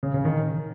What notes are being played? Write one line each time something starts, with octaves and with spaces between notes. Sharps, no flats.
C#3
C#3
D#3